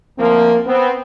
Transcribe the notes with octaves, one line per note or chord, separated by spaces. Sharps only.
D2 F3 A#3 C4
B3 C4